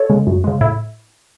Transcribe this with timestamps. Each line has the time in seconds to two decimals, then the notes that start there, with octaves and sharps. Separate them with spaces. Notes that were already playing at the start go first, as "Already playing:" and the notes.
Already playing: A4 C#5
0.10 C#3 G#3
0.27 F#2
0.44 C#3 G#3
0.61 A2 E4